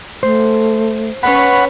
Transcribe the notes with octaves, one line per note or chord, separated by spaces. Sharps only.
A3 C5
C#4 B4 C#5 F#5 B5